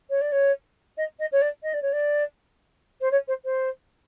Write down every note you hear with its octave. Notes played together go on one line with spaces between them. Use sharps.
C#5
D5
C#5
D#5
D#5
C#5
D5
D#5
D5
C#5
D5
C5
C#5
C5
C5